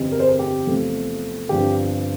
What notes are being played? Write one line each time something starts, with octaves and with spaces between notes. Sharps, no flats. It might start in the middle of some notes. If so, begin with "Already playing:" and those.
Already playing: G1 F2 E3 G3 C4
A#4
C5
A#4
G4
E2 C3 F3 A3 C4
G1 G2 F3 C4 G4